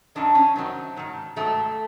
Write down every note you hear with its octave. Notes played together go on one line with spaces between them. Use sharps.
F#2 D#3 F#3 D4
C#4
F#2 D#3 F#3 C4
G#2 D#3 F#3
G#2 D#3 F#3 A3